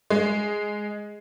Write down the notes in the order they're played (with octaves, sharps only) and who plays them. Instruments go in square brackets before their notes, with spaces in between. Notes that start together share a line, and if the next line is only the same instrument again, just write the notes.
[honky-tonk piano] G#3